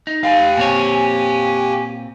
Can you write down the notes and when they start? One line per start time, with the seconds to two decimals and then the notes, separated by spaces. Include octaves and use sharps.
0.07 D#4
0.24 G4 F5 G#5
0.57 A#2 C4 C#5